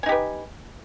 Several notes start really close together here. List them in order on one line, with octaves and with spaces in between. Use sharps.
G#5 D#4 G4 B4